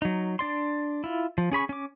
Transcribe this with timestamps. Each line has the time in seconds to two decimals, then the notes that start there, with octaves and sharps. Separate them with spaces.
0.02 F#3 D#4
0.39 D4 D5 C6
1.04 E4 F4
1.38 F3
1.52 C#4 G#4 B5 C#6
1.69 C#4 D6